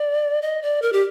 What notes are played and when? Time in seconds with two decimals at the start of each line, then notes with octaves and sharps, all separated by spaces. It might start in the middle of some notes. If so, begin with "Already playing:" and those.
Already playing: D5
0.42 D#5
0.62 D5
0.82 A#4
0.93 G4